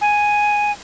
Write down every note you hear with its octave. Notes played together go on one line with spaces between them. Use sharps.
G#5